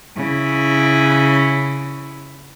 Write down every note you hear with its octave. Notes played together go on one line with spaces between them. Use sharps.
C#3 E4